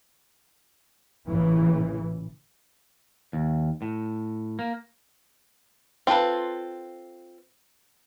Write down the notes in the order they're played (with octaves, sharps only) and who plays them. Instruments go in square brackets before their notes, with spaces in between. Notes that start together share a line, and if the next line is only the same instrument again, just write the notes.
[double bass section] A1 A#2 C#3 E3
[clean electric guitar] D#2
A2
A#3
[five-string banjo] C4 F4 A4 B4